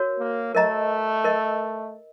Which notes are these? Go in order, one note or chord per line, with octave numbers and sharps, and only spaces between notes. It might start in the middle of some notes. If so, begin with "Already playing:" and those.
Already playing: F#4 A#4 C#5
A#3
A3 A#4 D#5 A#5
A#4 D#5